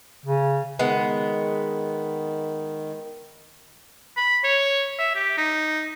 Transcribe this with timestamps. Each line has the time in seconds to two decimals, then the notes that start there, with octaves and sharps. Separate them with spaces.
0.25 C#3
0.79 D#3 G#3 B3
4.17 B5
4.44 C#5
4.99 E5
5.15 G4
5.37 D#4